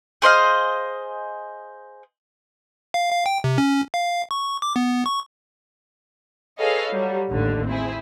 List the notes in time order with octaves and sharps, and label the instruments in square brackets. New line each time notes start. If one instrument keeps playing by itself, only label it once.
[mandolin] G#4 C5 D#5 F5
[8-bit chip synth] F5
F5
G5
C3
C#4
F5
C#6
D6
B3
C#6
[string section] G#4 A4 B4 C#5 D#5 F5
F#3 G3
A1 D#2 D3
C4 E4 G#4